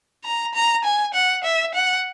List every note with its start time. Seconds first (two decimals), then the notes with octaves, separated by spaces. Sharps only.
0.25 A#5
0.54 A#5
0.85 G#5
1.14 F#5
1.44 E5
1.75 F#5